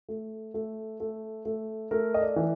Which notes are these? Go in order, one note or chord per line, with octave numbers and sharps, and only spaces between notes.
A3
A3
A3
A3
A3 A#4
D#5
D5
E3